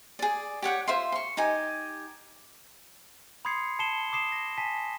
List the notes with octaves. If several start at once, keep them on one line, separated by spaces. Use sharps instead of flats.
G#4 D5
G4 C#5 F#5 G5
F4 C5 E5 C6
C6 C#6
D#4 G4 G#5
B5 C6 D#6 G#6 C7 C#7
A5 C7 C#7 E7 G7
D6 D#6 C7 E7
A#6
G#5 A5 B6